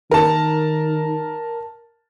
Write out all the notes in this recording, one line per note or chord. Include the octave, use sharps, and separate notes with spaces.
D#3 A#4 A5